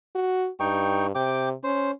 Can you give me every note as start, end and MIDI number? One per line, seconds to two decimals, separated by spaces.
0.15 0.48 66
0.60 1.14 43
0.60 1.07 63
0.60 1.07 79
0.60 1.07 85
1.15 1.53 48
1.15 1.49 79
1.15 1.49 86
1.63 1.91 61
1.63 1.91 72